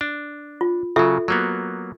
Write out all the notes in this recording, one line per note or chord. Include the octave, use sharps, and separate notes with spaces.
D4
F4
C#3 F#3 F4 A4 E5
F#3 A#3 B3